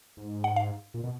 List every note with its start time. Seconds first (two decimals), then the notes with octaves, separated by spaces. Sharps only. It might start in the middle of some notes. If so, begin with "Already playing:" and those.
0.17 G#2
0.44 F#5
0.56 F5
0.94 A#2
1.04 B2